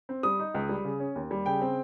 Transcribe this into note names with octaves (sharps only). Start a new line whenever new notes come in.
C4
G3 D#6
D#4
C#2
G3
C#3
C#4
D#2
G3
C#3 G5
C4